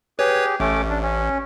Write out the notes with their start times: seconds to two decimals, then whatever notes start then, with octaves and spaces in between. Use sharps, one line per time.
0.19 G4 G#4 B4 C#5
0.60 A1 A3 C#4 D6
0.90 D4
1.02 C#4